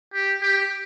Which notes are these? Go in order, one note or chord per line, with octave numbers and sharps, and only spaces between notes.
G4
G4